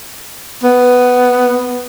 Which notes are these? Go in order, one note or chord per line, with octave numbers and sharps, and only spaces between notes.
B3